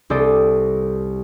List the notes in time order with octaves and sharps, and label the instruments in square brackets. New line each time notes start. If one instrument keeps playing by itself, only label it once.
[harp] C2 C4 A4 D5 G5 D#6